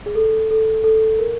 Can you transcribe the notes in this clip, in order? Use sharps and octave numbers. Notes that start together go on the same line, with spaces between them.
G#4
A4
A4
A4
A#4